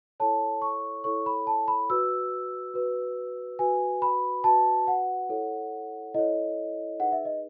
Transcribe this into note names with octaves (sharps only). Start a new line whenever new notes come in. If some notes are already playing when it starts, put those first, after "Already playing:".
E4 A4 C#5 A5
C#6
E4 A4 C#5 C#6
B5
A5
B5
F#4 B4 E6
F#4 B4
F#4 B4 G#5
B5
F#4 B4 A5
F#5
E4 A4 C#5
E4 A4 C#5 D#5
D#4 G#4 B4 F#5
E5
D#5